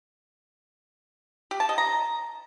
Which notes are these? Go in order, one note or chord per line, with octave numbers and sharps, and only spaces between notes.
G4
A5
D#5
A#5